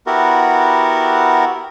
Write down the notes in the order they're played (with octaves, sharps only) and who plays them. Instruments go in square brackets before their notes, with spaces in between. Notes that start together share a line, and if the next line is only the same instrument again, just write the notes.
[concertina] B3 E4 F#4 G4 A#4